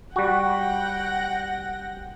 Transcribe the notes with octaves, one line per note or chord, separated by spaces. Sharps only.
G3 F#4 F#5 G5 A#6